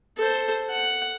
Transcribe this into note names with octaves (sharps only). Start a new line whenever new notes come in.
A4 C5
F#5